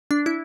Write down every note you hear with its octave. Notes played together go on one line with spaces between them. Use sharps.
D4
E4